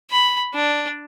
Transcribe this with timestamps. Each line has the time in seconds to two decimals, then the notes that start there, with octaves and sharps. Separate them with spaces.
0.11 B5
0.55 D4